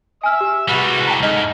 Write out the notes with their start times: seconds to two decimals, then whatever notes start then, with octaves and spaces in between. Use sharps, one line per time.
0.24 E5 G#5 E6 F6
0.41 G4
0.68 C2 G3 G#3 F#4 B4
1.07 G5 A5 A#5
1.23 G#2 A3 D#5 F6